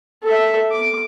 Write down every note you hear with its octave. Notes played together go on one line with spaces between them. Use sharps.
A4 E5
D6